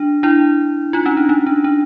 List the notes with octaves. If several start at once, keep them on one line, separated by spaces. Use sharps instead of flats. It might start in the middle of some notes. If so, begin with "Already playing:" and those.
Already playing: D4
D4 E4
D#4 F4
C#4 D#4
D4
C#4 D#4
D4
D4